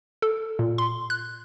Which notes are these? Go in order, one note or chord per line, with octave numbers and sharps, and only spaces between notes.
A4
A#2
C6
F#6